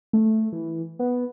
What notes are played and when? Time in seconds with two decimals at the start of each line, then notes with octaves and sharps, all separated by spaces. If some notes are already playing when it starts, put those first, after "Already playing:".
0.13 A3
0.52 E3
0.99 B3